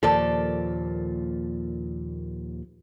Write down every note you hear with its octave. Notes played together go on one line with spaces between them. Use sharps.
D#2 A#2 F3 A4 D5